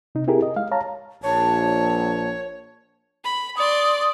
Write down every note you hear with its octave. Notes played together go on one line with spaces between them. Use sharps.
C3 D#4
C4 E4 G4 G#4 A#4
D#5
G#3 F5
C#5 F5 A5 A#5
A#1 C#5 A5
B5
D5 C6 D#6